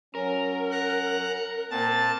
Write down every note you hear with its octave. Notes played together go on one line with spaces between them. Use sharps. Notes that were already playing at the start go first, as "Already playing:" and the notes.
F#3 C#4 A#4
F#5 A#5 F#6
A#2 C4 A5 A6